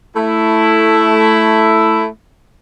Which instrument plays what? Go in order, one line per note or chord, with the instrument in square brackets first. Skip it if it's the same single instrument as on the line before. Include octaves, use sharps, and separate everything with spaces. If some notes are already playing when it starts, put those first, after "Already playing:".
[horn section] A3 E4